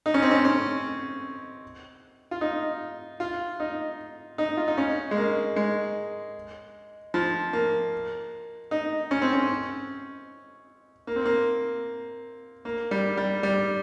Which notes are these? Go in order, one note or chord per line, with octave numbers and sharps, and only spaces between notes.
D#4
C#4
C4
C#4
C#4
F4
D#4
F4
D#4
D#4
F4
D#4
C#4
G#3
A#3
G#3
F3
A#3
D#4
C#4
C4
C#4
A#3
C4
A#3
A#3
G3
G3
G3